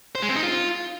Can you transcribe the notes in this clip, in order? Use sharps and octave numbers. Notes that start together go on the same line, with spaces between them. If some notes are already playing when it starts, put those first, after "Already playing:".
C5
G#3
C4
D#4
F4